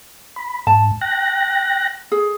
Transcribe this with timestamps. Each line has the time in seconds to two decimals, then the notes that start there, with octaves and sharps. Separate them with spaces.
0.36 B5
0.67 G#2 A5
1.01 G5 F#6 A#6
2.12 G#4